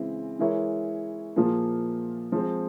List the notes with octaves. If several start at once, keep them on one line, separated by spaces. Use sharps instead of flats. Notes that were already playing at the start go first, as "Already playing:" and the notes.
Already playing: C#3 E3 G#3 C4 E4
E3 G#3 E4 A#4 C#5
A#2 F3 A#3 F4 G#4
F3 G#3 C4